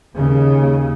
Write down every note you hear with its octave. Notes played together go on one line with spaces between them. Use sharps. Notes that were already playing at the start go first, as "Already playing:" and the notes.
D#2 C#3